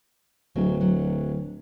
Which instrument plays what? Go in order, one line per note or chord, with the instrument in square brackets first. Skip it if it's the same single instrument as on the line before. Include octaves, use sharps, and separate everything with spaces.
[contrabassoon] D1 [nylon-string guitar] F#3
[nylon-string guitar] F#3